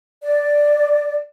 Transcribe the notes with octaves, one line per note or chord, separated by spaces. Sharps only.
D5